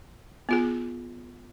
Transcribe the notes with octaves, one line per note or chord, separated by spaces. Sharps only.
B3 F4 G#4